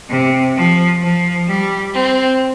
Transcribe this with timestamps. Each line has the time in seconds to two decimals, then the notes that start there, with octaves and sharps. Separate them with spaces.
0.10 C3
0.56 F3
1.01 F3
1.47 G3
1.94 C4